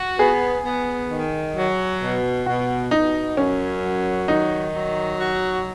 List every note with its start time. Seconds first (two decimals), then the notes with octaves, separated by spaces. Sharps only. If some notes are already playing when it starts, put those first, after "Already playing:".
Already playing: F#4
0.19 B3 G#4
0.64 B3
1.10 D#3
1.55 F#3
2.01 B2
2.46 B2 F#4
2.91 B2 D#4
3.37 F#2 C#4
3.82 F#3
4.28 D#3 D#4
4.73 F#3
5.19 F#4